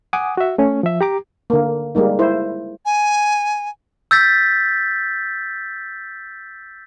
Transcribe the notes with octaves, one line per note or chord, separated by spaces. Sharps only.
F#5 G#5 D6 D#6
F#4 E5
A3 C#4
F3 E5
G4 A#5 D6
D3 A#3
G3 G#3 A#3 D#4
E4 C5
G#5
E6 G6 A6 B6